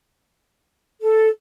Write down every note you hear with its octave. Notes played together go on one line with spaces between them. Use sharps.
A4